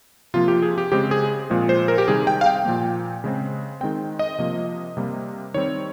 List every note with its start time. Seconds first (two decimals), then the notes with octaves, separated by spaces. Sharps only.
0.34 C3 F3 A#3 F4
0.48 G4
0.62 G#4
0.78 G4
0.92 C#3 G#3 C4 G4
1.11 G#4
1.50 A#2 F3 G#3 C4
1.69 C5
1.88 A#4
1.98 G4
2.08 C3 D#3 G3 G#4
2.27 G5
2.41 F5
2.46 G5
2.65 A#2 F3 A#3
3.24 C#3 G#3 C4
3.81 D#3 G#3 C4 G5
4.19 D#5
4.38 C3 F3 A#3
4.97 C3 G3 A#3
5.54 D#3 G3 C4 C#5